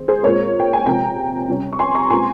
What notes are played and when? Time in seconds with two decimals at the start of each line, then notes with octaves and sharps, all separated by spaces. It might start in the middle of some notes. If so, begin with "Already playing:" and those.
Already playing: D#3 G#3 C4
0.08 G#4 C5
0.23 A#2 G#3 C4 A#4 C#5
0.60 G5
0.73 G#5
0.86 C3 F3 G#3 C4 G5 A#5
1.48 C3 G3 C#4
1.73 C#6
1.79 G#5 C6
1.95 A#5 C#6
2.10 A#2 G#3 C4 G#5 C6